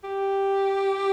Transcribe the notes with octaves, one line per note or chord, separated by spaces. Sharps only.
G4